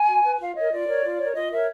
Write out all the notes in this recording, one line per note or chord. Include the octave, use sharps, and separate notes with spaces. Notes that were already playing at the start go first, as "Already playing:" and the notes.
Already playing: G#5
F#4
B4
F4 F5
A#4 C#5 D#5
F4 D5
A#4 C#5
F4
A#4 C#5
F4 D#5
A#4 C#5 E5